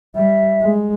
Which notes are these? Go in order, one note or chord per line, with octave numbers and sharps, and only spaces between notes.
G3 E5
G#3